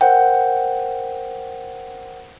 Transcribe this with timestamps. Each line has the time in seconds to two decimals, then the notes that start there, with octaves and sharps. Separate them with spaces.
0.01 A#4 C5 F#5 G5